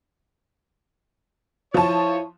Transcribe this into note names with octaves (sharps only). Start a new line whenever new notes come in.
F3 E4 C#5 A5